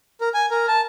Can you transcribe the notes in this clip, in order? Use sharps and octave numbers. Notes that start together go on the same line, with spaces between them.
A#4
G#5
A#4
A5